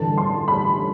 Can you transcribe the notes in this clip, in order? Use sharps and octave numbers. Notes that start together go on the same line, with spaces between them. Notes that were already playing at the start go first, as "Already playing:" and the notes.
Already playing: A1 G2 D3 G3 A5
C6
B5